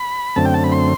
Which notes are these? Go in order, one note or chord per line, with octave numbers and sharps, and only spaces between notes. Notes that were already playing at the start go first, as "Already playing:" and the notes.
Already playing: B5
F#2 D3 A3 C4 A5
G5
A5
B5
C6